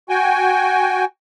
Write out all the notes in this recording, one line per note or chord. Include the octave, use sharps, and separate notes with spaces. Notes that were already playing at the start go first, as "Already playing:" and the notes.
F#4 G5 G#5